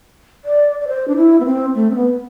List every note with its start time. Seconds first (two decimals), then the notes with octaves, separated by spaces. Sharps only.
0.45 D5
0.80 D5
0.88 C5
1.08 D4
1.16 E4
1.40 B3
1.45 C4
1.75 A3
1.91 C4
1.96 B3